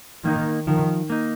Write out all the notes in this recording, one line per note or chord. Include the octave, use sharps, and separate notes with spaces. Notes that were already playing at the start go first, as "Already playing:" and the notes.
D#3 A#3 D#4
D#3 F3
A#3 D#4